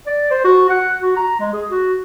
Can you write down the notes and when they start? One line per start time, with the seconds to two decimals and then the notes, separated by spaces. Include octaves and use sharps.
0.07 D5
0.31 C5
0.44 F#4
0.70 F#5
1.02 F#4
1.16 A#5
1.40 G#3
1.53 G#4
1.70 F#4